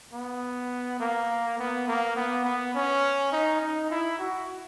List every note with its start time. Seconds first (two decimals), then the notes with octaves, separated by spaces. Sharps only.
0.13 B3
1.00 A#3
1.58 B3
1.88 A#3
2.16 B3
2.45 B3
2.75 C#4
3.32 D#4
3.61 D#4
3.90 E4
4.19 F#4